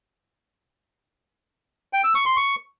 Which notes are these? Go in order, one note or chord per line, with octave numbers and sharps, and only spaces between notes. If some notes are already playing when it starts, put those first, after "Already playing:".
G5
E6
C#6
C6
C#6